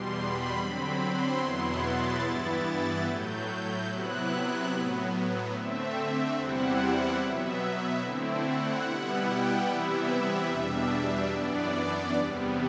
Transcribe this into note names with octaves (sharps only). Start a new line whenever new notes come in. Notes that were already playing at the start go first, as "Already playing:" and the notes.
Already playing: E2 B2 G3 C6
B5
D3 F#3 C4 B5
C6
E2 B2 F#3 B3 E4
A6
G2 E3 B3 E4
A2 F#3 A3 G6
G6
C3 F#3 B3 E4 F#6
A2 F#3 B3
D3 A3 C4 E5
E5
E2 C3 G3 C4 E4 F#5
B2 F#3 B3 E5
E5
D3 A3 C4 E4
F#5
B2 G3 B3 E4
G5
C3 E3 G3 B3 E4 E5
E2 B2 G3 D4
F#2 E3 B3 D4 D5
E2 C3 G3 B3